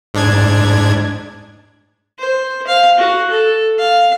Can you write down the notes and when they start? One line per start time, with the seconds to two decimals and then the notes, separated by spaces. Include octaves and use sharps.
0.14 G#2 D4 G#6
2.19 C5
2.67 F5
2.97 F#4
3.30 A4
3.78 F5